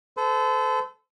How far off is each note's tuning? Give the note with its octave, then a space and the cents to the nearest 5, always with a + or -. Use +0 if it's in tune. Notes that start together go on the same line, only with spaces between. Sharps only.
A4 -15 C5 -40